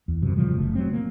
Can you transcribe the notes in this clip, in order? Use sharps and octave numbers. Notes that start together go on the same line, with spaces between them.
E2
F#2 C3
A#2 C#3 F3 G3
F#1 A3
F#3 C4
A#3